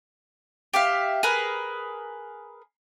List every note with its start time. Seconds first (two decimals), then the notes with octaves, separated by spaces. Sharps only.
0.74 G4 E5 F5
1.23 G#4 A#4 B4